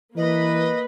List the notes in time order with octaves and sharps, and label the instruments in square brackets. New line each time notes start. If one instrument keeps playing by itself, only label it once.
[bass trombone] E3 [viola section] A#3 B4 [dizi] D#5